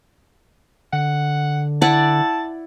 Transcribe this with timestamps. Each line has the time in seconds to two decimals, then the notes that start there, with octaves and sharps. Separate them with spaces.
0.93 D3 F#5
1.82 E4 D5 F#5 A5